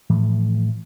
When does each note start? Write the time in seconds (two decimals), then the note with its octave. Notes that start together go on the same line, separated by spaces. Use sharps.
0.10 A2 E3 F3 A3